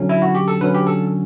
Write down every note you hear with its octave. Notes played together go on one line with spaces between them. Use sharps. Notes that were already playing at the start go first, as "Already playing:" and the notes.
Already playing: D3 F#3 C#4
E4
F#4
G4
A4
D3 F#3 C#4 B4
G4
A4